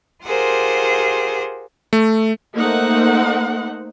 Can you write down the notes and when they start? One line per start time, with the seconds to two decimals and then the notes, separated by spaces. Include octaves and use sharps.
0.25 F4 G4 G#4 A#4 C5 F#5
1.93 A3
2.57 A3 A#3 D#4 C5 F#5